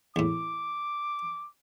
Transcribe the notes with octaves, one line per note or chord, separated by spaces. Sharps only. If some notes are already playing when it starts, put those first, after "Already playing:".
E2 A2 D6